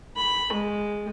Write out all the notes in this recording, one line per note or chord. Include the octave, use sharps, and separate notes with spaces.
B5
G#3